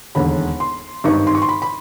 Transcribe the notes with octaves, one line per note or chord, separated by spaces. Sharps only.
E1 D#2 D3 B5
C6
G#1 G2 D#3 C#6
C6
C#6
C6
B5
B5